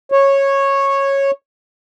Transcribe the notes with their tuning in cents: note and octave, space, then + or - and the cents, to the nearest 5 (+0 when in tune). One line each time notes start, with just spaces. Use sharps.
C#5 -10